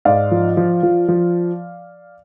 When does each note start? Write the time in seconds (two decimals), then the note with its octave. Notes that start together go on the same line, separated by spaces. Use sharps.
0.05 G#2 D5 F5
0.31 F3
0.57 F3
0.83 F3
1.08 F3